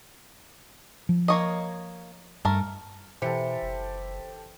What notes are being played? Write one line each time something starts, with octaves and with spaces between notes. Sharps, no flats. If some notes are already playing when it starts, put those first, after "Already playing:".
F3
A#3 C#5 D#5
G2 A3 A#4
B2 E3 G4 A4 C5 C#7
F#1